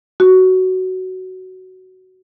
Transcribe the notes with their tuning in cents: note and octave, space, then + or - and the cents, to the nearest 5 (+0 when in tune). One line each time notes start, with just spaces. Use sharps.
F#4 +10